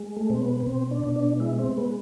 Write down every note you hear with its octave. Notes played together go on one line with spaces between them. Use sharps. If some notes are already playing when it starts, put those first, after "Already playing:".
Already playing: G#3
A3
B2 C4
B3
B3
B2 C4
D4
B2
D4
G#3 E4
C4
G#3 B3